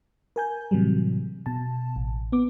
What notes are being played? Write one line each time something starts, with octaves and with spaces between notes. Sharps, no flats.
A#4 G#5 G6
A2 C3 E3 F#3 G3
B2 A5
A1
B3 D6